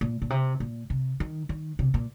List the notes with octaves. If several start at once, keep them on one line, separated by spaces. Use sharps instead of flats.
A#2
A#2
C3
A#2
C3
D#3
D#3
C3
A#2